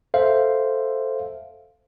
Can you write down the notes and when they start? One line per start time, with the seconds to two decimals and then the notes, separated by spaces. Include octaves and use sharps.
0.14 A4 C5 E5 F5